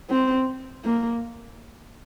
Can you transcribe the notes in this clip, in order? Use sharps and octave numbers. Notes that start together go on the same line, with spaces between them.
C4
A#3